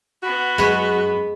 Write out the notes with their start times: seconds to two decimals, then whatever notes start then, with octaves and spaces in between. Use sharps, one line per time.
0.23 B3 F#4 B5
0.58 F#2 G#3 B4 C#5